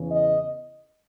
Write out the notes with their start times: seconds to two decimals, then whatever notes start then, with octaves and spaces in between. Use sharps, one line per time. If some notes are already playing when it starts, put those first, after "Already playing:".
Already playing: E2 C#3 E3
0.09 D#5